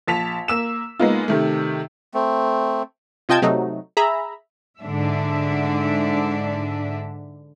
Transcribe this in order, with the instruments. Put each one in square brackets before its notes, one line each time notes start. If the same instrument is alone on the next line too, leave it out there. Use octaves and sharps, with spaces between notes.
[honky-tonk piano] A#1 A5 B6 F7
A#3 E6 E7
G#3 A#3 B3 D#4 F4
C3 D#3 A3
[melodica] A3 C4
[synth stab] C3 F4 D#5 G5 A5 G#6
C3 F#3 A3 D#4
G#4 E5 A#5 B5
[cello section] G#2 D3 D4 E5